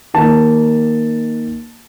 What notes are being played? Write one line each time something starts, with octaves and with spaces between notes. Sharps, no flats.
D#3 A#3 D#4 A5